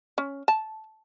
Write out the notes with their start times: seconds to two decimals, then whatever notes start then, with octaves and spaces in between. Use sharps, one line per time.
0.18 C#4
0.48 A5